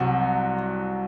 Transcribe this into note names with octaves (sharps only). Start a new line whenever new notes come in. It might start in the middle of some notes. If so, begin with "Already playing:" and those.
Already playing: C2 C3 F#3 F#4